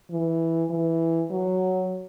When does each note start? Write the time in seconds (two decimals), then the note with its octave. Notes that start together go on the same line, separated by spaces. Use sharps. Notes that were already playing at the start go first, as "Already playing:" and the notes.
0.11 E3
0.70 E3
1.30 F#3